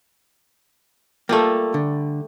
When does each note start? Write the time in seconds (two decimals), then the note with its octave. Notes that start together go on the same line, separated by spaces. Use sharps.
1.29 G3 A3 A#3 F4 A4
1.74 D3